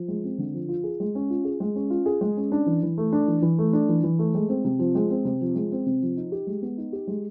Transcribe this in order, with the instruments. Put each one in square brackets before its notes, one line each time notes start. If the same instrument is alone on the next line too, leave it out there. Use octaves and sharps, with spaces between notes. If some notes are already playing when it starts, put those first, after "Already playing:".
Already playing: [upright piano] F3
G#3
C4
D3
F3
F4
G#4
G#3
C#4
F4
G#4
G#3
C#4
F4
G#4
G#3
C#4
D4
E3
E3
A3
D4
E3
E3
A3
D4
E3
E3
A3
G#3
C4
C3
F3
G#3
C4
C3
F3
G#3
C4
C3
F3
D#4
G4
G#3
B3
D#4
G4
G#3